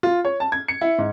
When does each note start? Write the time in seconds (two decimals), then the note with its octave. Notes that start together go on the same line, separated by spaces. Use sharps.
0.03 F4
0.25 C#5
0.40 A5
0.52 G#6
0.68 C#7
0.81 E4
0.98 G#2